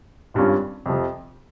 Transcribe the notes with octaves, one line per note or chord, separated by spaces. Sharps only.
G#1 G2 G3 C#4 F4
F2 C3 F3